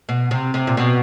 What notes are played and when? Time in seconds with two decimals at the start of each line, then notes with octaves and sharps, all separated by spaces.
0.09 B2
0.31 C3
0.54 C3
0.67 A#2
0.77 B2